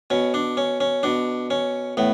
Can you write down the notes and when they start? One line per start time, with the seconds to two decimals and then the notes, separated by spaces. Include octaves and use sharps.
0.10 B2 C#4
0.34 D4
0.57 C#4
0.81 C#4
1.03 B2 D4
1.50 C#4
1.97 A2 B3